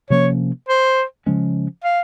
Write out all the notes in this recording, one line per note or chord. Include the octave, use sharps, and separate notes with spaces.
C3 F3 A#3 C#4 C#5
C5
C#3 F3 G#3 C#4
F5